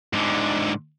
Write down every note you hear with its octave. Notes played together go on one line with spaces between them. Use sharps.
G#2 D3